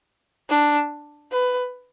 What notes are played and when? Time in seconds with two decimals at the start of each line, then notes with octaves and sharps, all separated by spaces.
0.50 D4
1.32 B4